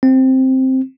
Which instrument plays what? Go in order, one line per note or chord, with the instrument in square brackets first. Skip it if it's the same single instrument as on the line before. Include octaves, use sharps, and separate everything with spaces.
[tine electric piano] C4